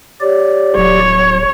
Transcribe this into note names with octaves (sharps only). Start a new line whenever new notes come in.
G4 C#5 D5
D1 F#3 C#5